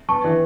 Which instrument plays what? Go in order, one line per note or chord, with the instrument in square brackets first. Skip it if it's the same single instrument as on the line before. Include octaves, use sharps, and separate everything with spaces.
[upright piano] B3 [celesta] A5 C#6
[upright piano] E3